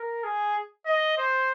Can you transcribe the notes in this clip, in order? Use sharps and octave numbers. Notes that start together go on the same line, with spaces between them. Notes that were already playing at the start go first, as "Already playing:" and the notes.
Already playing: A#4
G#4
D#5
C5